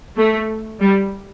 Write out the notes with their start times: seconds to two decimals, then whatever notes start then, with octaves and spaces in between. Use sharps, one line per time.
0.17 A3
0.81 G3